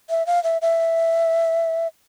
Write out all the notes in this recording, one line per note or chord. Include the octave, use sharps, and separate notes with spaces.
E5
F5
E5
E5